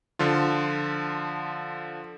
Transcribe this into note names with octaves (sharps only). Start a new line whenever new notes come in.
D3 F3 F4